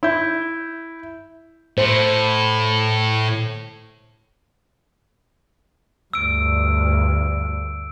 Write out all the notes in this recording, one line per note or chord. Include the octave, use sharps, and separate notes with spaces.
E4 G6
A2 C5
D2 G2 E6 D7